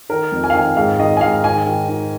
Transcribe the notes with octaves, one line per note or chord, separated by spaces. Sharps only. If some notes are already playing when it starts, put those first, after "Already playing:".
D#3 A#4
F2
G#5
F5
D#3 G#5
G#2 F5
D#3 D#5
G#5
G#2 F5
D#3 G#5
D#3
D#3